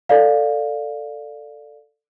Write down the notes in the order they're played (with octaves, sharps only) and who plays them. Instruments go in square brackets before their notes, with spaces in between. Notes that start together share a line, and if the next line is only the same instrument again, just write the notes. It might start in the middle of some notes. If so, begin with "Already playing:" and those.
[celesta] A4 D5 F5